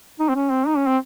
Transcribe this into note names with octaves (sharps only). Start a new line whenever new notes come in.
D#4
C4
C#4
C4
D#4
C#4
C4